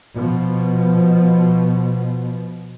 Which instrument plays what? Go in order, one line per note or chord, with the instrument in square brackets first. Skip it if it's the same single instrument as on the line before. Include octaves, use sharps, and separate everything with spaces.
[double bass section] B2 F3